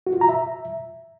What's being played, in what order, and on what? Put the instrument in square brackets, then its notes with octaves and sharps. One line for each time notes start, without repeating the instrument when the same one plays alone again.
[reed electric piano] F#4
F4
A#5
E5